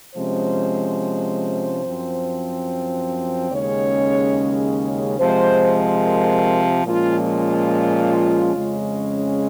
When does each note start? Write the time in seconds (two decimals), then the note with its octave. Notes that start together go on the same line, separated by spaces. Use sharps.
0.15 C3 F3 G#3 C#4 C5
1.83 F#2 F3 C4
3.51 D#2 C#3 G#3 C#4 C#5
5.18 C3 F3 G#3 C5
6.03 A#4
6.87 A#2 F3 G#3 C#4 F4
7.28 F4
8.54 F2 C#3 G#3 C#4